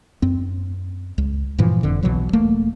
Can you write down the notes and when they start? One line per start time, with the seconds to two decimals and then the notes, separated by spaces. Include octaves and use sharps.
0.22 F#2 C4
1.18 C#2
1.58 G2 A#2 E3 F3
1.83 F#1 F2 D3
2.03 B1 B2 E3 F#3
2.33 E1 A3 A#3